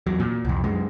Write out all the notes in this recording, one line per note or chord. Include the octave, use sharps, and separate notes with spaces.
E2 F#3
A#2
C2 F2
F#2 G#3